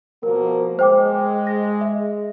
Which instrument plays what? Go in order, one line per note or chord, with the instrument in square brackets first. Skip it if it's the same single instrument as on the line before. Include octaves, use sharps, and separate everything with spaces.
[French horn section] B2 F3 A#3 [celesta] A#4
[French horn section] G#3 [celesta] C5 G5 D6
[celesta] A#6
E5